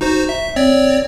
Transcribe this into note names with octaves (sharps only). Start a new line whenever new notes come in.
D#4 F#4 C5
E5
C4 C#5 D5